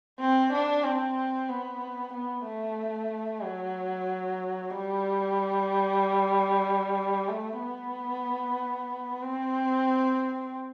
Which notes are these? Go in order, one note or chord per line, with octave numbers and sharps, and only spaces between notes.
C4
D4
C4
B3
B3
A3
F#3
G3
A3
B3
C4